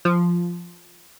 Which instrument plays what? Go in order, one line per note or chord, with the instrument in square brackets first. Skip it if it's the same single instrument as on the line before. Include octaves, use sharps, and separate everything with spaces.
[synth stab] F3